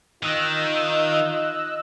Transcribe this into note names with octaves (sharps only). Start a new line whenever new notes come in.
D#3 D#4 F4 D#5 E6 F#6